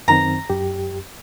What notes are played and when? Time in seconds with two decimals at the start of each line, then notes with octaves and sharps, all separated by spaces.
0.08 F#2 D#3 C4 A#5
0.50 F#2 G4